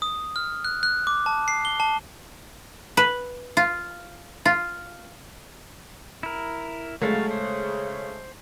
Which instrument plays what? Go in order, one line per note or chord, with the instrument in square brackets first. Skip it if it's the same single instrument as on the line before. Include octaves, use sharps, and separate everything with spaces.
[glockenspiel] D#6
F6
F#6
F#6
D6
A5
C7
G7
A5
[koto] B4
F4
F4
[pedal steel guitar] E4 A#4
[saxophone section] C#3 [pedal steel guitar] F#3 F5 A5 [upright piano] G#3 A3
[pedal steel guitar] C5